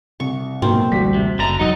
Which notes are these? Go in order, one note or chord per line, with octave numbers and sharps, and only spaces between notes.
C2 C#6
G#2 B2 F#3 A#3 C4
A1 D2 G3 F#4 B6
C3
F#1 D3 A#5 A6
E1 F#3 D#4 D#5